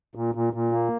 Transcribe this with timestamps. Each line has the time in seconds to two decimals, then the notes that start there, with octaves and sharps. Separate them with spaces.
0.15 A#2
0.35 A#2
0.53 A#2
0.72 A#3